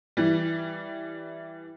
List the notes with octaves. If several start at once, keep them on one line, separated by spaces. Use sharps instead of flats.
E3 G3